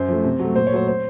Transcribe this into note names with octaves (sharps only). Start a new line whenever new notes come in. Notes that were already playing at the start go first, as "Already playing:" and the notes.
Already playing: F#2 C5
F3 A3
C3
F#3 A3
A#2 C5
C#5
F#3 A3 C5
C5